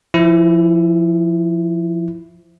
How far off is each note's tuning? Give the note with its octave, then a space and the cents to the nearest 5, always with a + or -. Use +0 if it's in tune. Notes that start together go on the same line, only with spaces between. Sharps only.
F3 -10 E4 +10